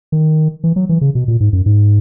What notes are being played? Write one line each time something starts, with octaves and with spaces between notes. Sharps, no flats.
D#3
E3
F#3
E3
C#3
B2
A#2
G#2
F#2
G#2